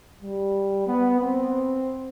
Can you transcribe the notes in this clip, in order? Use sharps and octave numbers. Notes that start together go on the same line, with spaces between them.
G3
B3
C4